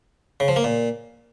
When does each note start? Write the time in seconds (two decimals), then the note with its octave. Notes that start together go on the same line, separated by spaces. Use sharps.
0.40 C#3
0.48 F3
0.56 A#3
0.64 A#2